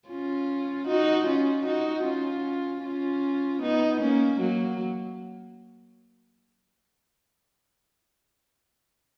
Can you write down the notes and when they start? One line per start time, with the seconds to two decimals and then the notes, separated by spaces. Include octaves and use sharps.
0.08 C#4 F4
0.87 D#4 F#4
1.27 C#4 F4
1.66 D#4 F#4
2.04 C#4 F4
2.83 C#4 F4
3.62 B3 D#4
4.00 A#3 C#4
4.40 F#3 A#3